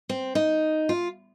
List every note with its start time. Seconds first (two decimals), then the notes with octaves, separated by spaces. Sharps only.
0.09 C4
0.35 D#4
0.89 F4